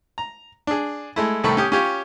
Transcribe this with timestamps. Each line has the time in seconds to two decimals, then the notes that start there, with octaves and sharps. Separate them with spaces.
0.18 A#5
0.67 D4 G#4
1.16 G#3 A3 E4
1.44 C2 A2 D#3 A3 B5 C#6
1.57 C#4 G4 D#6
1.72 C#4 F4 G4 C#5